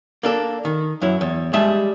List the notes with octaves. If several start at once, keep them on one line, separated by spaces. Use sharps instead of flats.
A#3 D4 A4
D#3
F#2 F#3 E4
E2
G3 G#3 E5 A5